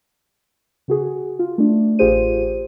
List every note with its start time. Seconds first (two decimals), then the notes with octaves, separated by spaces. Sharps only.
0.88 C#3 F#4 G#4
1.39 F4
1.58 A3 D4
1.99 A1 F4 G4 G#4 C5 D#7